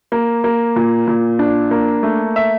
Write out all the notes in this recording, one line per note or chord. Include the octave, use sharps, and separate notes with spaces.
A#3
A#3
A#2
A#2
D4
A#3
A3
E5